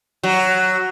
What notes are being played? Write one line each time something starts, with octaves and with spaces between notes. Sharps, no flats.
F#3